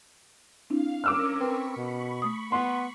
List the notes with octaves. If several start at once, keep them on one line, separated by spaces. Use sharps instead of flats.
C4 D4 E4 F5
C#4 A#4 D6 E6 F6
C4 A#4 B4 B5 C#6
B2
A3 D#6
B3 C6